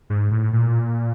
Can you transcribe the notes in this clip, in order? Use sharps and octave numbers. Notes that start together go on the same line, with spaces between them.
G#2
A2
A#2